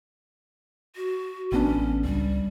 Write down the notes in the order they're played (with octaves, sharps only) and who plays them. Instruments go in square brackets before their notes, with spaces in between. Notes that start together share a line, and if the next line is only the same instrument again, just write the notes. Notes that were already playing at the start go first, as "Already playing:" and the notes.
[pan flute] F#4
[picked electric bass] A1 B3 D4 [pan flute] C#4
[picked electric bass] C#2 [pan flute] G3